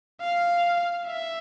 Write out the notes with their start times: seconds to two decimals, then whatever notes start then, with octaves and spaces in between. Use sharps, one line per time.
0.20 F5
1.06 E5